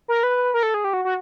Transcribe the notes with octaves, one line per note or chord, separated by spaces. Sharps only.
A#4
B4
A#4
A4
G#4
G4
F#4
F#4